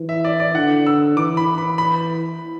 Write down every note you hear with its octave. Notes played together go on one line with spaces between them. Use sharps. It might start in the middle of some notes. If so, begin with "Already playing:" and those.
Already playing: E3
E5
D5
D5
D3 F#5
E6
E3 D6
B5
B5
B5